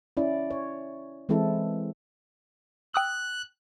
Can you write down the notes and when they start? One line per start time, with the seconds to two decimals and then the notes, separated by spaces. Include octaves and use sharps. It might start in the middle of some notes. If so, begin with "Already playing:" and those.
0.17 C#4 E4 D5
0.51 C#5
1.29 E3 G#3 C4 E4 A4
2.94 G5 D#6 E6 F#6